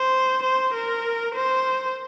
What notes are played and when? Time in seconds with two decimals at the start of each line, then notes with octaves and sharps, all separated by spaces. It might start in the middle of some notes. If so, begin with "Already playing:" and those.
Already playing: C5
0.43 C5
0.74 A#4
1.35 C5